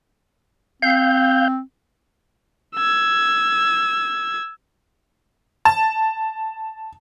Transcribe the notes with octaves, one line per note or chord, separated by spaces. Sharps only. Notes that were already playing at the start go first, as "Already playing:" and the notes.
C4 F5 G6
E6 G#6
A5